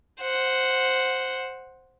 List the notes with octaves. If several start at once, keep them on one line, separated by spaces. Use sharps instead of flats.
C5 F#5